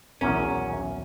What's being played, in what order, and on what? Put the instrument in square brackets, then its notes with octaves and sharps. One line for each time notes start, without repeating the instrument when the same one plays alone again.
[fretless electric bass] D#1 B1 B2 [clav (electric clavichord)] E2 G#2 A#4 [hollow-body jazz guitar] C#4